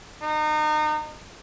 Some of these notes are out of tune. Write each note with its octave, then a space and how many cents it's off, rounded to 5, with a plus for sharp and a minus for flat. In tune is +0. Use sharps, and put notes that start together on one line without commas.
D#4 -30